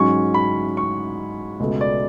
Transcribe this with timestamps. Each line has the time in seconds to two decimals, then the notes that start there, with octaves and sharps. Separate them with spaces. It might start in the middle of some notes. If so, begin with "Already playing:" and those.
Already playing: G#2 F#3 C#4 C#6
0.34 B5
0.77 C#6
1.60 C#2 B2 A3
1.81 D5